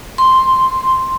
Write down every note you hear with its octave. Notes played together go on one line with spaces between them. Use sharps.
C6